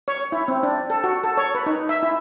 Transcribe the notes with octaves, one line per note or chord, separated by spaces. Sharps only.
C#5
E4
C4
D4
A4
F#4
A4
C#5
B4
D#4
E5
E4